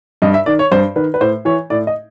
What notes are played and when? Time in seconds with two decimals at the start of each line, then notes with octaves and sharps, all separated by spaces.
0.22 G2 D#5
0.34 E5
0.46 D#3 D5
0.59 C#5
0.71 G2 C5
0.96 D#3 B4
1.14 B4
1.20 A2 C5
1.45 E3 C#5
1.70 A2 D5
1.87 D#5